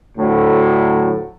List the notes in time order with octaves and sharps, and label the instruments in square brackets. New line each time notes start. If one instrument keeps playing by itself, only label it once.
[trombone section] D2 A2 F#3